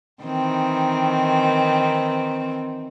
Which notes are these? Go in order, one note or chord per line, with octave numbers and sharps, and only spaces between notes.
D#3 E3 C4